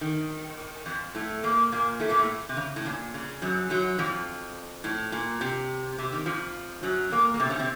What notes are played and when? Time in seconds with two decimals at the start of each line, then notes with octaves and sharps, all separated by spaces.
0.01 D#3
0.86 F2 F3
1.15 A2 A3
1.43 A#2 A#3
1.72 A#2 A#3
2.00 A2 A3
2.09 A#2 A#3
2.19 A2 A3
2.49 C3
2.57 C#3
2.76 A2
2.86 A#2
3.14 C#3
3.42 F#2 F#3
3.70 F#2 F#3
3.99 F2 F3
4.84 A2
5.12 A#2
5.41 C3
5.98 C3
6.12 D#3
6.26 F2 F3
6.83 F#2 F#3
7.11 A#2 A#3
7.34 A#3
7.40 C3 C4
7.50 C#3 C#4
7.59 C3 C4